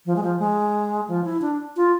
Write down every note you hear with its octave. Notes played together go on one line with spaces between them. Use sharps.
F3
G#3
F3
G#3
F3
E4
D4
F4